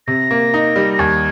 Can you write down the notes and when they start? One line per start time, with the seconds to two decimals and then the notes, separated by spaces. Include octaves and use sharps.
0.07 C3 A#6
0.31 A#3
0.54 D#4
0.76 G3
0.94 A#6
0.99 D#2 G#6